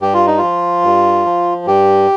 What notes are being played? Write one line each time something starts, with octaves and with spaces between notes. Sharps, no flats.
G2 G4
F4
D#4
F3 F4
G2
F3
G2 G4